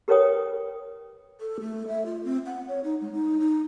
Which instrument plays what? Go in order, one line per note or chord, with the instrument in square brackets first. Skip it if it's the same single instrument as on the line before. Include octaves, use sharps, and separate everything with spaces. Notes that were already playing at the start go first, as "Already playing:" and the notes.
[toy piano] G4 A#4 B4 C#5 G5 D#6
[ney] A4
A3
E5
F4
C4
F#5
C#5
D#4
G#3
D#4
D#4